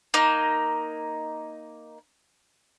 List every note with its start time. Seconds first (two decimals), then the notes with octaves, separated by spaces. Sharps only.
0.14 A#3 D#4